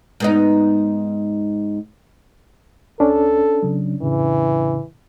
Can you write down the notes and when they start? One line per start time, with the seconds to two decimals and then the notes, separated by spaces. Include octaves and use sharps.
0.20 G#2 B3 D#4
3.00 C#2 C#4 D4 A4
3.63 C#3 F#3
4.02 F2 A2 C#3 E3